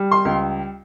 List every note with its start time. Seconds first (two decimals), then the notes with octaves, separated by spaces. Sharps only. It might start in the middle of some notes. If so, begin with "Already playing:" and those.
Already playing: G3
0.11 C6
0.25 C#2